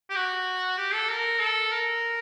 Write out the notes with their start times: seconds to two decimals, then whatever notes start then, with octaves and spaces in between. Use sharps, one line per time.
0.10 G4
0.16 F#4
0.78 G4
0.94 A4
1.09 A#4
1.40 A4
1.72 A#4